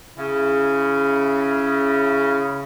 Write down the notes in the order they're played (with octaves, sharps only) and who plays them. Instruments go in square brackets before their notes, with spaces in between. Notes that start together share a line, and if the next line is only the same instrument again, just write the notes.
[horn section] C#3 E4